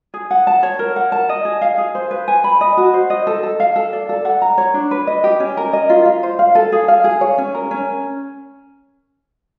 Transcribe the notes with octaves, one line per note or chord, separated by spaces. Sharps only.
G#4
F#5
A5
C#5
A#4
F#5
A5
D#5
G#4
F5
G#4
C5
B4
G#5
B5
D#5
F#4
C5
D#5
A4
A4
F5
A4
D5
A4
F#5
A#5
C#5
D4
B4
D#5
G4
C#4
A#4
D#5
F4
F4
C5
F5
A4
G#4
F5
G#4
C#5
C#4
A#4
C#4